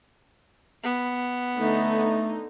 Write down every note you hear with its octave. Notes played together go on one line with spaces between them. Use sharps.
B3
D3 A3 D#4